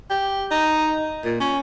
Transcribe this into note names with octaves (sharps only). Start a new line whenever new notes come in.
G4
D#4
A#2
C#4